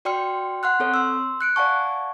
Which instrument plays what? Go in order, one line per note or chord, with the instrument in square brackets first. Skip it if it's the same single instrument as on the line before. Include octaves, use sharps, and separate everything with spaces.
[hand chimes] F#4 D5 G5 C6 F6 C#7
F#5 C6 F6 F#6
C4 A4 C#5
C6 E6
F#6 C#7 D7
D5 F5 F#5 G#5 A5 C#6